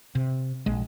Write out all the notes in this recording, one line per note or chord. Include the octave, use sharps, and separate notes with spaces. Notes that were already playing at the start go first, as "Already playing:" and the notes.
C3
A#1 G#3